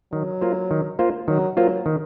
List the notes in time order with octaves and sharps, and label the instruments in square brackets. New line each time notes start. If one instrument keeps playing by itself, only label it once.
[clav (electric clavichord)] D#3 [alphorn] F#3
[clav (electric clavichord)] A#3 F4 C5
D#3
A#3 F4 C5
[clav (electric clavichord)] D#3 [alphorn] F#3
[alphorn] F#3 [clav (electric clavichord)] A#3 F4 C5
[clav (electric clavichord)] D#3